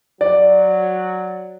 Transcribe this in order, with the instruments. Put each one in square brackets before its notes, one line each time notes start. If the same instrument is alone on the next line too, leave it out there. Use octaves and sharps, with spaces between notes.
[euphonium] F#3 [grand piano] D5